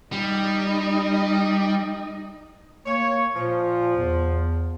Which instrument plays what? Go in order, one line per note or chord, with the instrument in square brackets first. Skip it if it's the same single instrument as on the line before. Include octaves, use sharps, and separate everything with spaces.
[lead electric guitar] G3 [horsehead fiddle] D#4 D#5
[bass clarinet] A#3 [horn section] C#5
[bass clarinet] A#2 [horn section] F3
[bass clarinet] E2